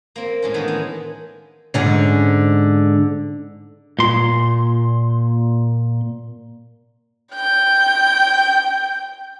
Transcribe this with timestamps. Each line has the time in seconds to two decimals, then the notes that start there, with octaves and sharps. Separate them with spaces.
0.16 A#3 C4
0.42 A2 G#3 C#4
0.54 D#3 E3 B3 D4 D#4
0.68 G#3
1.74 G#2 D3 C#4
3.99 A#2 C6
7.33 G5 G6